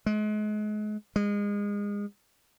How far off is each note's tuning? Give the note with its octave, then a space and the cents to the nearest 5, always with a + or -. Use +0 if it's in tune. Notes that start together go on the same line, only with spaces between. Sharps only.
G#3 +35
G#3 -30